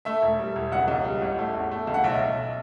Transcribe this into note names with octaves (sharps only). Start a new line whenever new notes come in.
A3 E5
E1
G3
E1
C#2 F#5
C#2
G3
A1
A3
E2
A3
C#2
F#5
B1 E5
B1